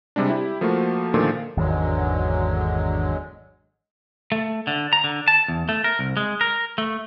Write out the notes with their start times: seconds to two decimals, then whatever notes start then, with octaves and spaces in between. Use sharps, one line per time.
0.16 C3 G3 G#3 D4
0.30 E4 G4
0.61 F3 A3 A#3 F4 F#4
1.14 A#2 D3 D#3 F3 A3 F4
1.57 G#1 E2 D3 D#3 F#3 G#3
4.32 A3
4.67 D3
4.93 A#5
5.04 D3
5.28 A5
5.48 E2
5.69 A3
5.84 A#4
5.99 C2
6.17 G#3
6.41 A#4
6.78 A3